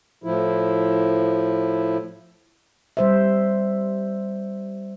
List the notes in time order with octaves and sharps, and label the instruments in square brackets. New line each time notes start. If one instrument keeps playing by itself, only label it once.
[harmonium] A2 F3 E4
[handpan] G3 C5 E5